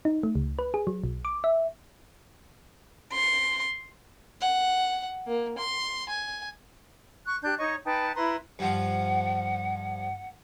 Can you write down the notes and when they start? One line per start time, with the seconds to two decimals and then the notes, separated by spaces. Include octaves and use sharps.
0.05 D#4
0.23 A3
0.35 C#2
0.59 B4
0.74 G#4
0.87 F#3
1.04 B1
1.25 D6
1.44 E5
3.13 C6
4.41 F#5
5.27 A#3
5.58 C6
6.09 G#5
7.26 C#6 F#6
7.42 D4 G4 F#6 G6
7.58 D#4 C#5 D#5 C#6
7.84 D#4 B4 G5 A5
8.15 E4 B4 A#5 C6
8.59 G2 F3 F#5